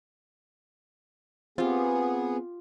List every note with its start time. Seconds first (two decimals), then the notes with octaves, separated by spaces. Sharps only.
1.58 B3 C4 F4 G4 G#4